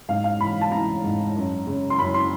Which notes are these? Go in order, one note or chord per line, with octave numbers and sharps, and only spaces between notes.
G#2 F5
F5
E3 B5
A5
E3 A#5
G#2
F#2
C#3
C6
F#2 B5
C6